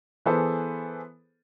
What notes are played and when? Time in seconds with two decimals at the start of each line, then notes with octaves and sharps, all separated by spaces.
0.26 E3 B3 G#4 A4 C5